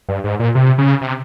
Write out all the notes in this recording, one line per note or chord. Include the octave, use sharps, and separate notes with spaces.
G2
G#2
A#2
C3
C#3
C3